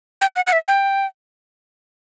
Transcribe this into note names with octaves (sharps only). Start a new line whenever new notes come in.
G5
F#5
F#5
E5
G5